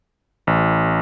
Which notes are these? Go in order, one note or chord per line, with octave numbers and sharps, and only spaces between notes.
A1